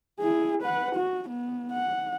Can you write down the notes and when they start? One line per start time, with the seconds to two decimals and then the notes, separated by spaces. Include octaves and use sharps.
0.20 E4 G#4
0.62 B4 F#5
0.95 F#4
1.29 B3
1.73 F#5